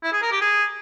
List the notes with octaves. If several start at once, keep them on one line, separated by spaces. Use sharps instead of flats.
E4
G#4
A#4
G4
G#4